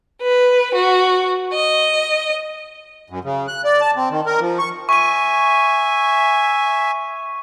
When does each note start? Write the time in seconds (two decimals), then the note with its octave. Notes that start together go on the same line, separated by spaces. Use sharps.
0.21 B4
0.74 F#4
1.52 D#5
3.10 F#2
3.24 C#3
3.48 F#6
3.65 D5
3.81 A5
3.96 C4
4.11 D#3
4.26 A#4
4.40 F3
4.59 C#6
4.89 E5 G#5 C#6 D#7